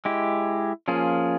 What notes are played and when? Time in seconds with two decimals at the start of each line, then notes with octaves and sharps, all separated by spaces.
0.05 G#3 E4 G4
0.88 F3 A#3 C#4 F4 G#4